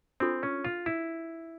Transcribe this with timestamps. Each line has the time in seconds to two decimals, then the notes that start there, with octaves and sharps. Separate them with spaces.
0.20 C4 D4 F4 A4
0.43 C#4
0.64 F4
0.86 E4